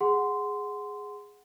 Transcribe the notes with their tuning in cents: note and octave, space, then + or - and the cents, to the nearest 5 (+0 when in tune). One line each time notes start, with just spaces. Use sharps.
G#4 +0 F#5 +0 C6 -15